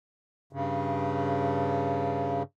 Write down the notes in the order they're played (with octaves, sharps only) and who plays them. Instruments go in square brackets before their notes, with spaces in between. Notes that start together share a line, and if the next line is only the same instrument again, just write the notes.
[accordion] G2 C#3